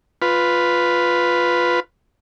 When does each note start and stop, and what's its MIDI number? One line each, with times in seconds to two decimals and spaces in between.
0.22 1.80 65
0.22 1.80 71